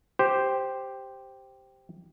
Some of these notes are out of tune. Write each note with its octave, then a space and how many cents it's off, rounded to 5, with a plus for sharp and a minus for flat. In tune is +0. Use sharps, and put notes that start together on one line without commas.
G4 +0 C5 +0